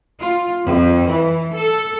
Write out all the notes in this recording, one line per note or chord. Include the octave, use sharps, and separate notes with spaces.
F4
F2
E3
A4